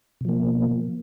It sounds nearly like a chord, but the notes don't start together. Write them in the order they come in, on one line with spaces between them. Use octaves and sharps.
B2 F3 A#3